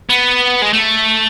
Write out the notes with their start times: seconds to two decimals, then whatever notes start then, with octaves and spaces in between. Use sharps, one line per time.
0.10 B3
0.62 G#3
0.73 A3